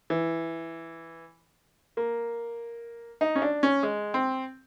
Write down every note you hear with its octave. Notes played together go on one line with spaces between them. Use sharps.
E3
A#3
D#4
C#4
D4
C#4
G#3
C4